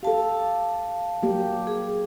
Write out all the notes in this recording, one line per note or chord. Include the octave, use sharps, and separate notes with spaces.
G4 A4 F5 A5
F#3 A#3 G4
G#4